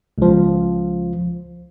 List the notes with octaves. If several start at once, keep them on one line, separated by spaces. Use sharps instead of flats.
C#2 F3